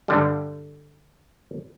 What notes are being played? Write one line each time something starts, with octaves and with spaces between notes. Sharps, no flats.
G2 D3 G3